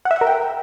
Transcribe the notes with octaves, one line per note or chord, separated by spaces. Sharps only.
F#5
E5
F#5
A#4
G5